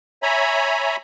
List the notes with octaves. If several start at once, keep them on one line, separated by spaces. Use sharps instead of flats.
C#5 E5 G#5 A#5 B5